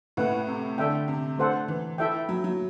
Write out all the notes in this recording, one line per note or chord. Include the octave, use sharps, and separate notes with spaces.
A2 A3 E4 B4 F#5
C3
D3 D4 A4 E5 G5
C3
A3 D4 A4 C5 F#5
E3
E4 A4 E5 G5
F#3
F#3